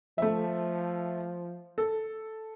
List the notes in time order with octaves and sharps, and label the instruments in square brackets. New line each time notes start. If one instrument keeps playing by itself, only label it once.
[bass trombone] F3 [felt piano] A3 E5
[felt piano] A4